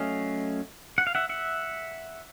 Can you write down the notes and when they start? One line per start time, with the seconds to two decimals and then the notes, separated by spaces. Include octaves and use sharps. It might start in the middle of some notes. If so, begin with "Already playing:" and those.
Already playing: F#3 A3 C#4 D#5 F5
0.98 F#5
1.07 F5
1.15 E5 F#5
1.29 E5 F#5